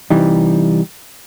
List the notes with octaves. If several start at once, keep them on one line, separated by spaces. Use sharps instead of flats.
C3 E3 G3 D#4